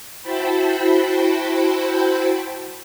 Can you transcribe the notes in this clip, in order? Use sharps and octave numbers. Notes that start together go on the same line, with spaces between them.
E4 F#4 C5 G5 A5 B5